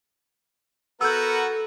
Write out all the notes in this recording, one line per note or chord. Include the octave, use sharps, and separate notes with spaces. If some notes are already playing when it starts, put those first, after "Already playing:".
B3 F#4 A4 A#4 E6 G6